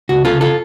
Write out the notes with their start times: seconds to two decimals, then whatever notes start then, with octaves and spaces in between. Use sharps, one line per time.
0.09 C#2 F#4
0.25 C#3 F4 A4
0.41 F4 A4